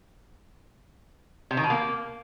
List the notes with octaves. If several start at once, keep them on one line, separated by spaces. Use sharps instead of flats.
C3
D#3
B2
A#3